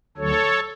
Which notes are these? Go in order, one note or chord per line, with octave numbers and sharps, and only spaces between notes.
D2 D3 F#3 A4 C#5